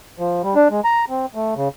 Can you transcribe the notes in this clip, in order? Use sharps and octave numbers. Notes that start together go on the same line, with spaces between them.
F3
G3
D4
G#3
A#5
C4
A3
C#3